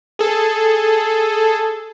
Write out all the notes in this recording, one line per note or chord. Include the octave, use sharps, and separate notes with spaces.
G#4 A4